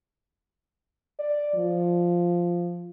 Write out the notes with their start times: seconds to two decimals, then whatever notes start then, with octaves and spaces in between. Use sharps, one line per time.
1.19 D5
1.55 F3